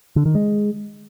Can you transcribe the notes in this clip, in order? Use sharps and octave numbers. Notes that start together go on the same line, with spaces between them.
D3
D#3
G#3